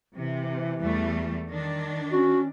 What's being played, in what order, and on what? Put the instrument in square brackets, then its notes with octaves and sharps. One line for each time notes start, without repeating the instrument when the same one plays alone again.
[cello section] C3 [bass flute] E3
[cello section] E2 G3 A3
D#3 D4
[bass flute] C#4 [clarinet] F#4